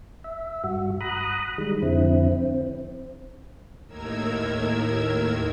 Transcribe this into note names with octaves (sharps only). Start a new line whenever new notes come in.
E5
G2 F#4
A#5 B5 D#6 F#6
D#3 G3 G#3
F2 D3 C4 E4
C4
D#2 A2 D#3 A#4 E6 G#6